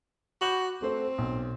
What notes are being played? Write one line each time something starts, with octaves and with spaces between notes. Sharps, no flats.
F#4 B5 D6 G6
A3 C4 C5
B1